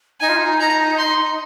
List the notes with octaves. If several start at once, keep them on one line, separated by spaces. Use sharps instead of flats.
D#4 G#5
F4
D#4
A#5
C6